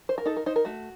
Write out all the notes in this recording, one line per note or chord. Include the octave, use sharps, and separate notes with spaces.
C5
A#4
D#4 A4
A#4
D#4 C5
A#4
A3 F#4